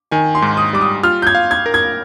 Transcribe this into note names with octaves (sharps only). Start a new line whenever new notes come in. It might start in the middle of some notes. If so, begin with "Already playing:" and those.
D#3 G#5
C6
G#2
D#6
G3 D6
D#6
F4 F6
G6
G#6
F5
G#6
A#4
G#6